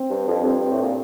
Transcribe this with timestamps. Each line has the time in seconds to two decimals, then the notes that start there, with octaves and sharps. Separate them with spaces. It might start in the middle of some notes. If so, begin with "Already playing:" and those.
Already playing: C4
0.10 G2
0.28 F2
0.45 G2 C4
0.71 A2
0.82 A#2